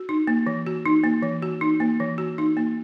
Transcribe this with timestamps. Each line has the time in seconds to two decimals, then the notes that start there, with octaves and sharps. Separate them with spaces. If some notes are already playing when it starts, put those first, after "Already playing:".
Already playing: F#4
0.09 D#4
0.27 A#3
0.47 E3
0.67 F#4
0.86 D#4
1.04 A#3
1.23 E3
1.42 F#4
1.61 D#4
1.80 A#3
2.00 E3
2.18 F#4
2.38 D#4
2.57 A#3